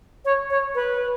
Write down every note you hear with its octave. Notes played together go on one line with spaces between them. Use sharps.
C#5
C#5
B4